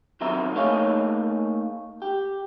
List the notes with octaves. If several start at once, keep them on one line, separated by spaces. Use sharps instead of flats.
B1 D#3 F#3 C4 E5 A#5
A3 A#3 D#4 G#4 C#5 F5
G4